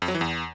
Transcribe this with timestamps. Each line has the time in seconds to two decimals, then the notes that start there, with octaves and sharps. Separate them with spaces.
0.02 F2
0.08 F#3
0.14 E3
0.21 E2